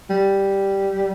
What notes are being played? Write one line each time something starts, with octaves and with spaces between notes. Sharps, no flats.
G3